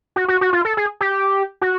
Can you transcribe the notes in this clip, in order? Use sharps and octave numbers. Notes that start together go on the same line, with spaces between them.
F#4
F#4
F#4
F4
A4
G#4
G4
F#4